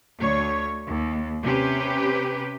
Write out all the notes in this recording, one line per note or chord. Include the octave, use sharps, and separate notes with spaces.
D2 C#5
D#2
C3 C#4 G4 B4